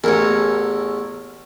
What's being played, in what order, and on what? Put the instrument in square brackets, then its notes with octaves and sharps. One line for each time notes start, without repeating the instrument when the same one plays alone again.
[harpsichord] A1 E2 [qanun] A#4 C#5